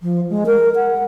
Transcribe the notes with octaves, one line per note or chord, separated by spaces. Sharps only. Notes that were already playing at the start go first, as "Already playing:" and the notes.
F3
G#3
A#4
F#5